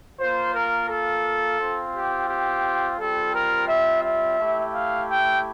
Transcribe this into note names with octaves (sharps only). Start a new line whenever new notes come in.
A#3 F4 C5
A#4
A4
C4 F4
G4
G4
G3 C4 F4 A4
A#4
E5
E5
A3 E4 G4
F5
G5